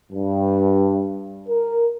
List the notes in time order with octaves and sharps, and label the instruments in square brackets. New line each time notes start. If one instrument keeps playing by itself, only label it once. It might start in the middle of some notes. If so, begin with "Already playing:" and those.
[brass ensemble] G2
A#4